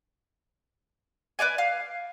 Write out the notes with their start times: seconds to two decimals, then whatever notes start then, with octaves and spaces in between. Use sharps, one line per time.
1.39 B4 C#5 D5 G#5
1.58 F5